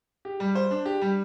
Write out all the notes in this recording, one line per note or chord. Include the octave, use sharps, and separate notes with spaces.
G4
G3
C5
D4
G4
G3